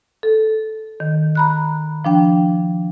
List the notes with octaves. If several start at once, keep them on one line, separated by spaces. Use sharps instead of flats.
A4
D#3
A#5 B5 F#6
F3 D4 G5